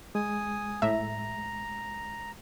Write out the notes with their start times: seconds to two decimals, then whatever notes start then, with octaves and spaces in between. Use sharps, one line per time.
0.15 G#3 G#5 D#6
0.82 A2 E5 A#5